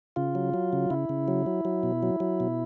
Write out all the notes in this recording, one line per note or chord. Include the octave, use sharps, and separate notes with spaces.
C#3 F4
F#3
F#3
C#3
C#3 E4
C#3
F#3
F#3
F#3
B2
F#3
F#3
B2